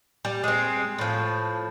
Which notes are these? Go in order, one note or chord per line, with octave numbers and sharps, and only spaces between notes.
G3
G#3 C4
A2 F3